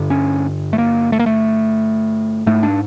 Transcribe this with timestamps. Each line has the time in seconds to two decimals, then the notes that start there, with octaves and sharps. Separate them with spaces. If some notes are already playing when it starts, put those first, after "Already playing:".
Already playing: G2 D3
0.10 C#4
0.73 A3
0.78 A#3
1.12 A3
1.19 A#3
1.26 A3
2.47 G#2 A3
2.63 D4